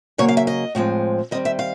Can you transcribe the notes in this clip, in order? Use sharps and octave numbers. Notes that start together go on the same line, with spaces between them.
C#3 F#3 A#3 C#5
F5
E5
D#5
A2 F3 G#3 C4
D#3 G3 C4 D#5
E5
F5